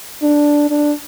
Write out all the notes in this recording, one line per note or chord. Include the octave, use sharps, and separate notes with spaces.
D4
D4